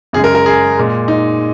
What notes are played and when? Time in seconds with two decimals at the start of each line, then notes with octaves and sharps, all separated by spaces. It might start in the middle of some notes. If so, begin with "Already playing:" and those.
0.13 F#2 C#3 G#3 G#4
0.24 A#4
0.35 A#4
0.46 G#4
0.77 A#2 G#3
1.08 D#4